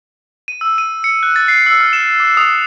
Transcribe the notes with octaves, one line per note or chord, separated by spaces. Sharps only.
D#7
E6
D#7
C#7
F#6
A6
C7
E6
F6
E7
D6
D#6